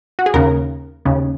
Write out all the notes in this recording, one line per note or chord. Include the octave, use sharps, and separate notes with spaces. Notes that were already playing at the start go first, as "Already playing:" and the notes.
F#4
G#4
D#2 C#3 A#4
D#2 C#3